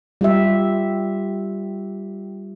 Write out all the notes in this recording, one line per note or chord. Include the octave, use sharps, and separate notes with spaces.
G3 F4 G4 E5